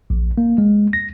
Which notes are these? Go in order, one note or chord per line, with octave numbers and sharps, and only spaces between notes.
A#1
A#3
G#3
A#6